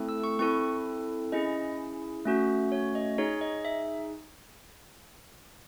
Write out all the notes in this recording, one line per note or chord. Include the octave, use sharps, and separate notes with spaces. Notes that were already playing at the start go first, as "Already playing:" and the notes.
Already playing: A3 C4 E4 A4
E6
C#6
C4 E4 A4 C#6
C#4 E4 G#4 D#5
A3 C#4 F#4
C#5
D#5
D#4 G#4 C#5
D#5
E5